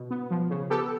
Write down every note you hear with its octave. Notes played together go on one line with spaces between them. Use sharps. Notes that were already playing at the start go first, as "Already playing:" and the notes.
Already playing: B2
B3
F3
C#3
B3 G4 A4